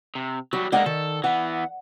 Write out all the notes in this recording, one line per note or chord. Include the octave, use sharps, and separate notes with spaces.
C3
F#3 G3 F#4
D3 G#3 A#3 D5 F#5
D#3 A4
E3 B3 F#5